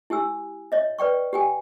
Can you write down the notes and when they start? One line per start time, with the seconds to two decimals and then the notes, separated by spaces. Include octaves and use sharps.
0.10 E4 G4 G#5 E6
0.72 C#5 D#5 E5
0.98 B4 D5 G5 C#6
1.33 G4 G5 G#5